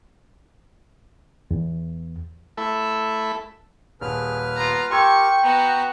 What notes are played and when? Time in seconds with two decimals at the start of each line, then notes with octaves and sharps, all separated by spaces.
1.51 E2
2.57 A3 E4 A4 E5
4.01 D#1 G#4 B4 F6
4.56 B3 F4 A#5
4.91 G4 A#4 G5 C6 C#6 E6 G#6
5.43 B3 F#4 A#5